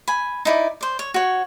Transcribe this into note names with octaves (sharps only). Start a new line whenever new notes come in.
G#5 B5
D#4 E4 D5
C5 D5
C#5
F#4 C#5